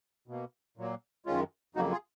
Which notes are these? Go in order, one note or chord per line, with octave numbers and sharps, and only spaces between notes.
B2 A#3
A#2 F#3 A#3
F#2 D#3 G#3 C#4 F4
F2 C#3 F#3 A#3 D#4 F#4
F4 G#4